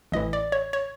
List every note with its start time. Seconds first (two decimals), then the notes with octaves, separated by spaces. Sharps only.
0.12 A1 A2 E3 D#5
0.33 D5
0.52 C#5
0.73 C#5